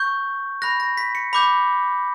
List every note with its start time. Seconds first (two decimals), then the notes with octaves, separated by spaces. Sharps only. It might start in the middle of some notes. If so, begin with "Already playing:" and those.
Already playing: C#6 G6
0.62 B5 F#6 A#6
0.80 A#6
0.97 B6
1.15 C#7
1.33 B5 D6 G6